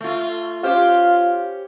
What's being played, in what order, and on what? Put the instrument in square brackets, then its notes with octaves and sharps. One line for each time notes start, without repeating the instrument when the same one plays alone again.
[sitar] A3 F4
[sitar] C#4 G4 C5 [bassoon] F4